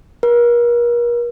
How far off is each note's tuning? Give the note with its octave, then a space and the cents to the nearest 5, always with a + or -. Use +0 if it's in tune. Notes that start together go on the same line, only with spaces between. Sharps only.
A#4 +40